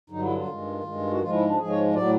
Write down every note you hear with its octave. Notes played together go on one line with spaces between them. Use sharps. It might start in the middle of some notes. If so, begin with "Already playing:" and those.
G2 D3 F#3 D#4
E4
F4
G2 D#3 G#3
G2 D#3 G#3
F#4
G#2 F3 G#3 F4
E4
D4
G#2 F3 G#3 G#4
C#5
A2 F#3 D5